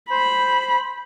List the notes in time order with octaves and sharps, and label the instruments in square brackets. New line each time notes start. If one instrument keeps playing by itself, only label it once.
[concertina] C5 [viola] B5